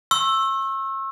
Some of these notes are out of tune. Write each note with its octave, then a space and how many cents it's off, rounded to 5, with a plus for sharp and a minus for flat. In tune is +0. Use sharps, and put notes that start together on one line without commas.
C#6 -40 E6 +0